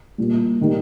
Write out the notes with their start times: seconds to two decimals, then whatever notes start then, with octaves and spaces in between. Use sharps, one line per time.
0.18 A#2 G3
0.61 D#3 G3